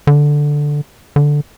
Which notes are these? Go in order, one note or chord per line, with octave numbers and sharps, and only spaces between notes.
D3
D3